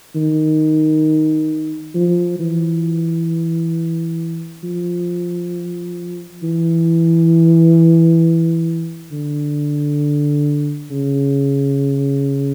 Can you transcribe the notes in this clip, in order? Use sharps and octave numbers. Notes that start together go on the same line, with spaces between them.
D#3
F3
E3
F3
E3
D3
C#3